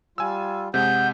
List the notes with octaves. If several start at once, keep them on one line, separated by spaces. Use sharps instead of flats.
G3 F4 G#5 E6
C3 G#3 G#4 F#5 G6